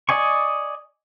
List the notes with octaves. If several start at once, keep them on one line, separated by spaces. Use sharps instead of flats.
D5 D#5 G#5 C#6